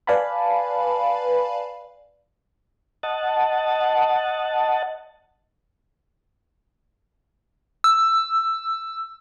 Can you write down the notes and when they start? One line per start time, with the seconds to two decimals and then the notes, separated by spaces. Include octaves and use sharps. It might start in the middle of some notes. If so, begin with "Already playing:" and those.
0.07 B4 D5 F5 G#5 A5 B5
3.03 D#5 F#5 A5
7.84 E6